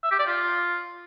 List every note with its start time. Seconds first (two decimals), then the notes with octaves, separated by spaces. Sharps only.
0.03 E5
0.11 G4
0.19 D5
0.27 F4